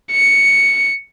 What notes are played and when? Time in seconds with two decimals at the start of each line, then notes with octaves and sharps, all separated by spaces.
0.12 C#7